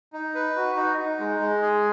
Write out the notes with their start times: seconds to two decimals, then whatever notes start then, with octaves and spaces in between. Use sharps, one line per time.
0.13 D#4
0.35 B4
0.56 F#4
0.76 D#4
0.98 D#4
1.19 G#3
1.40 G#3
1.62 G#4